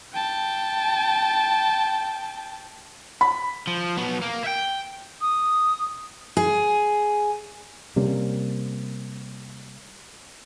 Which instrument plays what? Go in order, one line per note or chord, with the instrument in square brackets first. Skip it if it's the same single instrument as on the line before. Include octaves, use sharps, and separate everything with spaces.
[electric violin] G5 A5
[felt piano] B5
[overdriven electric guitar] F3
F#3 B3
A#3
E5 G5
[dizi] D#6
[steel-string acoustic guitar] G#4
[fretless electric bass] C3 G3 A#3 C#4